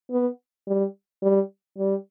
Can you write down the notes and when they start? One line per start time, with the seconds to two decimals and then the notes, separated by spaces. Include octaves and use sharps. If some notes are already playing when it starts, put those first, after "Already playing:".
0.11 B3
0.67 G3
1.23 G3
1.78 G3